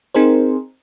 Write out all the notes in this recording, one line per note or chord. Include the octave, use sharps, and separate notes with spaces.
C4 D#4 G#4 A#4 C5